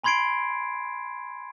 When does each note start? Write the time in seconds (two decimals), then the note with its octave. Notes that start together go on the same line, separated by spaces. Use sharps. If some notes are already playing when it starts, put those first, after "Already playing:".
0.04 G#5 B5 C6 G#6 C7 D7